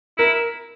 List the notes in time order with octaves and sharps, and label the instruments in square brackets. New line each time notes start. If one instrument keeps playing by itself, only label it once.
[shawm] E4 [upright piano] A#4